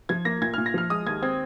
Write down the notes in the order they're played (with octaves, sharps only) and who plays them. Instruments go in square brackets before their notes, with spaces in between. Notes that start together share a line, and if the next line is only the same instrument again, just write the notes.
[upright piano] F3 G#6
A#3 A#6
A#2 G#6
F6
A#2
A#6
F3 F6
G#3 D#6
D#2 G#6
C4 G#6